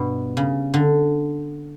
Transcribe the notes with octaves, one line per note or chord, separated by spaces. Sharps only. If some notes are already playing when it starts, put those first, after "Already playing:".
Already playing: G2 B2
C#3
D3